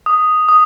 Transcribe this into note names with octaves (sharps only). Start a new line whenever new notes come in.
D#6
D#6